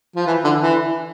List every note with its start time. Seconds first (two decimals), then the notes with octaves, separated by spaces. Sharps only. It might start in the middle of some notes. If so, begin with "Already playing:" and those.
0.16 F3
0.26 E3
0.44 D3
0.63 E3